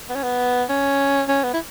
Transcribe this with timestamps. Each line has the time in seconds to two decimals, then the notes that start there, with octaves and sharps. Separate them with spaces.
0.09 B3
0.15 C#4
0.23 B3
0.69 C#4
1.28 C#4
1.44 B3
1.53 E4